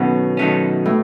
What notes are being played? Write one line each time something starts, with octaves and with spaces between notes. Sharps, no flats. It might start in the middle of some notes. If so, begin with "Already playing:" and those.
Already playing: B2 D#3 F#3 A3 C#4
D#3 F#3 A3 C#4
A2